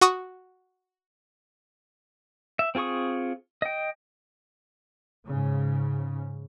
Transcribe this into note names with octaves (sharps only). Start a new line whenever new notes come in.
F#4 C#6 D#6
E5
C4 F4 G#4 C#6 D#6
D#5 G5
G#2 C#3